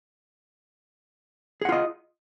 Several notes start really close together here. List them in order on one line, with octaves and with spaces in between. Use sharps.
G#4 F#5 F4 D#5